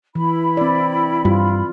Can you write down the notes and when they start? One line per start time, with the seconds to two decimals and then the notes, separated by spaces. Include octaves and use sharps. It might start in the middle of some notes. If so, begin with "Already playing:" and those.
0.15 E3 E4 B5
0.57 C4 D5
1.25 G2 F4